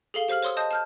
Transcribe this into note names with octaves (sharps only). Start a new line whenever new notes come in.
G#4 A4 F5 G7
G4 C5 F5 F6 F#7
C5 C#5 C6 D#6 E6
D#5 A5 D#6 G6
A5 F6 G6